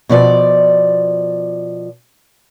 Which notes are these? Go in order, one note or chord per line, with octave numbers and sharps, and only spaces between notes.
B2 F3 D5